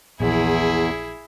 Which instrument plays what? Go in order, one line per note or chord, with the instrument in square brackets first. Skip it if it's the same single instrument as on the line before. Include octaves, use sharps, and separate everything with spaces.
[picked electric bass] A#1 [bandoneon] E2 [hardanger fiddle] E4 G#4